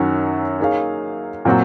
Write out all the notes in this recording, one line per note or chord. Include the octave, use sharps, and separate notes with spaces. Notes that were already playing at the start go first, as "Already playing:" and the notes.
Already playing: F#2 D#3 F#3 C#4 F#4
A#3 D#4 G#4 C#5 F5
A#2 F#3 C4 F#4